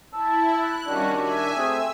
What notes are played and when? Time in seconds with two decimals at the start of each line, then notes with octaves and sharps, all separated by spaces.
0.13 E4 A5 E6
0.56 F#6
0.86 D#3 G3 C#4 D4 F#4
1.16 E5 G#5
1.56 A3 C4 G#4 E6